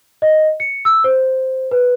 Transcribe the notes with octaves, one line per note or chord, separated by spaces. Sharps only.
D#5
C#7
E6
C5
B4